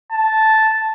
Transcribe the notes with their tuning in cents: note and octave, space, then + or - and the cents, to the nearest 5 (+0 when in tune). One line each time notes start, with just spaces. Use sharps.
A5 -5